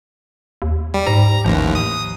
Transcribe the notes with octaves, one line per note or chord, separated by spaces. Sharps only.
D#2
G3
G#2 A#5
A1 D#2 F3
D#6